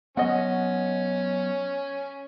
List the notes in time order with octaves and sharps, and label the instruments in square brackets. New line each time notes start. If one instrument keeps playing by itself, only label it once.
[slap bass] F#3 B3 [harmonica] C#4 [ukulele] D#5 F#5